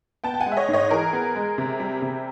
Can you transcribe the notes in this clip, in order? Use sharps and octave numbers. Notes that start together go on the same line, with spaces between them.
B3 G5 A5
G5
F#5 G#5
G#3
E5
C#5 D#5
G#2
C#5 D#5
E3 G#4 A#4
B3
G#3
C3
G3
C3